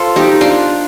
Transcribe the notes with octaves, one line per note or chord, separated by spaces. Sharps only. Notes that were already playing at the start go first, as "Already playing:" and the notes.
Already playing: F4 A4 C5
D#4 G4
D4 F4